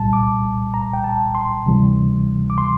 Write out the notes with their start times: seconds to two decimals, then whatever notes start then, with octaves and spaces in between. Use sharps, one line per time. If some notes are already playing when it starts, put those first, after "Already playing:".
Already playing: C2 A#2 G3 A5
0.13 D6
0.74 A#5
0.93 G5
1.04 A5
1.35 C6
1.66 D2 C3 E3 G3
2.50 D6
2.58 C6